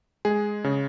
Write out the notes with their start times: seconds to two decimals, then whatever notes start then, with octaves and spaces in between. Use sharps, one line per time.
0.25 G#3 G#4
0.64 C#3